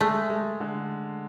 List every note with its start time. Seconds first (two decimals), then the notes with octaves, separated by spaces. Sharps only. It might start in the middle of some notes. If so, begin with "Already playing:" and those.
0.01 G#3 A3
0.30 G#3
0.60 D3